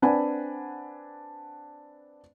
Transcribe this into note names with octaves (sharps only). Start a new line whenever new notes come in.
C4 D4 B4 F#5 G#5 B5